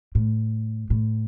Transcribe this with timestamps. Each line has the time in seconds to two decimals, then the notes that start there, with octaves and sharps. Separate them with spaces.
0.15 A2
0.90 A2